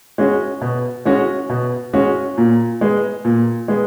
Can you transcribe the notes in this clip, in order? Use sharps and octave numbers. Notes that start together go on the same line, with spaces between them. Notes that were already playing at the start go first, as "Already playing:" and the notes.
G#3 C#4 F#4
B2
G#3 C#4 F#4
B2
G#3 C#4 F#4
A#2
G#3 B3
A#2
G#3 B3